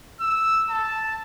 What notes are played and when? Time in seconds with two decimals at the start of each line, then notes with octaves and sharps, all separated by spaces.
0.21 E6
0.70 A5